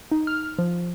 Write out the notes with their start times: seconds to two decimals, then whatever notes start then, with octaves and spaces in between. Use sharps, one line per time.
0.11 D#4
0.27 F6
0.59 F3